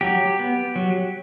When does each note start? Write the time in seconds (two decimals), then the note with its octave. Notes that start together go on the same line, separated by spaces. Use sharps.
0.01 F#3 G4
0.39 B3
0.76 F#3